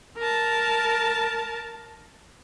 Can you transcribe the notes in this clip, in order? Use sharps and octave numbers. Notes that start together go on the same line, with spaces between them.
A#4 A5